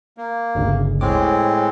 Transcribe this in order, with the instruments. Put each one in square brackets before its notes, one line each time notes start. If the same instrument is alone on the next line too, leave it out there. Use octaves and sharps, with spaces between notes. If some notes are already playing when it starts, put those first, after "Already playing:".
[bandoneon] A#3
[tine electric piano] G1 D2 C#3
[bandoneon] A2 G#3 C4 [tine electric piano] C#5 D6